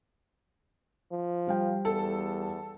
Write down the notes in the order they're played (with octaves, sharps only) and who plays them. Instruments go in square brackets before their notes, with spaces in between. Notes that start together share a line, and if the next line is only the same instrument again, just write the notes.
[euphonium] F3
[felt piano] G3 F5 G5
[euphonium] E2 [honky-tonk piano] A4